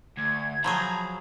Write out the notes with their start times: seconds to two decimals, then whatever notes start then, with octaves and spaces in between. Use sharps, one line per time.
0.18 D2 G#6
0.64 F3 F#3 G#4 A#5 B5